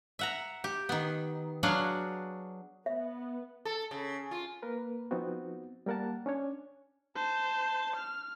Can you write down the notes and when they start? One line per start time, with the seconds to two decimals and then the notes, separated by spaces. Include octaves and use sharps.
0.19 E5 F#5 A#5
0.64 G4
0.89 D#3 B3
1.63 F#3 D4 F#4 G#4 F5 F#5
2.86 B3 E5
3.65 A4
3.91 C#3
4.31 F4
4.62 A#3 A#4 B4
5.11 F3 B3 C4 D#4 F#4
5.86 G3 A#3 A#4 F#5 A5
6.26 C#4 D4 C#5
7.16 C5 A5
7.96 F6